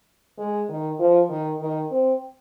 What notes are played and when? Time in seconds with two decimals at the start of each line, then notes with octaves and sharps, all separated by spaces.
0.38 G#3
0.69 D#3
0.99 F3
1.30 D#3
1.61 D#3
1.91 C4